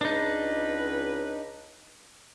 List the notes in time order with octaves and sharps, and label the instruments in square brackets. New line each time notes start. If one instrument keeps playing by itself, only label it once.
[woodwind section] C#2 B4 [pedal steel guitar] D4 D#4